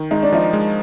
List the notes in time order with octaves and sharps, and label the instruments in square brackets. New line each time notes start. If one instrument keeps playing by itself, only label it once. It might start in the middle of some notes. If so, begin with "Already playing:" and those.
Already playing: [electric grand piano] D#3
[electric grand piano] G#3 [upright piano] D#4
[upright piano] D4
[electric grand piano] F3 [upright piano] D#4
[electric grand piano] G#3